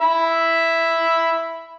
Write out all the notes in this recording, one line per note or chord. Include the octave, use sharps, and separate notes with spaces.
E5 B5